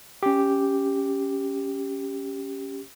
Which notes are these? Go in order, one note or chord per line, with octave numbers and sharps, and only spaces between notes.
C#4 G4